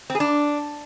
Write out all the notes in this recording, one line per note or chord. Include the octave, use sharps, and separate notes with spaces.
C4
G#4
D4